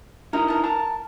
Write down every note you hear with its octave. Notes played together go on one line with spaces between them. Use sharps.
D#4 E4 A#4
A#4 A5
A#4 A5